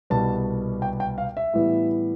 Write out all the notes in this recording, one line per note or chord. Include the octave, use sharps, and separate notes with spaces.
C2 B2 G3 B3 A5
G5
G5
F5
E5
A2 E3 G3 B3